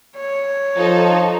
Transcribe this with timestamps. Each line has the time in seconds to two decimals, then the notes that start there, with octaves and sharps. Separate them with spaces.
0.16 C#5
0.77 F3 D#4 A4 C5